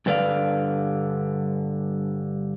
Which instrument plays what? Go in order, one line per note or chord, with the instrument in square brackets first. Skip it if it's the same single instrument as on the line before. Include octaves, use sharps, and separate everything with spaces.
[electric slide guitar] G2 D3 B4 D5 F5